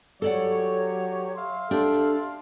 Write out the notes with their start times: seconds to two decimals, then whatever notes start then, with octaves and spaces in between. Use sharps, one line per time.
0.22 F#3 G4 A4 C#5 D5 F#5
1.36 E5 F5 C6
1.71 D4 G4 A4